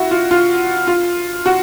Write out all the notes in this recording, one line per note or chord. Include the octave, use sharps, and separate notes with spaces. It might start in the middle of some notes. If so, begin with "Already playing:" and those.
Already playing: E4 F#4
F4
F4
F4
F#4